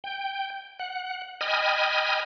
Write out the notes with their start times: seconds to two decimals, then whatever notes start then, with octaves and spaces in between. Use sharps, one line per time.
0.04 G5
0.80 F#5
1.41 D#5 G5 G#5 B5 D#6 F6